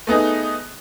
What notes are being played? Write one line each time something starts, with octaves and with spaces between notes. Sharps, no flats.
A3 B3 D#4 G#4